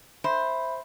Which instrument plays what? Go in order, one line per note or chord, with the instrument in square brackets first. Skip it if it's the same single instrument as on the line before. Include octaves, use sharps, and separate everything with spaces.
[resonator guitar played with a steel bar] C5 [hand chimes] E5 B5